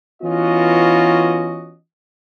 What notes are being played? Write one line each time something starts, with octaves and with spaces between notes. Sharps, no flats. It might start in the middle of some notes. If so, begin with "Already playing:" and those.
E3 B3 C#4 F4 F#4 D#5